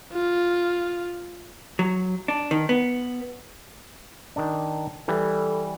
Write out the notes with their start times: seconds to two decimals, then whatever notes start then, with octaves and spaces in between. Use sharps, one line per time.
0.13 F4
1.79 F#3
2.28 D4
2.51 D#3
2.69 B3
4.36 D#3 D4
5.08 E3 G3 A4